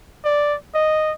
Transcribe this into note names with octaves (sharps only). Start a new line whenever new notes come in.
D5
D#5